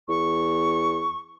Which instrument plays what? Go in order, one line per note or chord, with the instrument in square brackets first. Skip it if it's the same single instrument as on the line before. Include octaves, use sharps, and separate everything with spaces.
[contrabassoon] E2 [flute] C#6